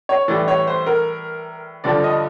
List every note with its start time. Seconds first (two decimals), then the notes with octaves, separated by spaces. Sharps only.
0.09 C#5
0.28 A2 E3 G3 D5
0.48 C#5
0.67 C5
0.87 A#4
1.84 G2 D3 F3 D5
2.04 D#5